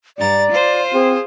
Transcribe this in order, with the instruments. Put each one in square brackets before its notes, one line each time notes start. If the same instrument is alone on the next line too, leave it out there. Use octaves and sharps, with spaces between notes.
[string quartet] G2 A#5 A6 [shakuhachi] D5
[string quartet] F4 C5
[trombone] C4 [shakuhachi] G#4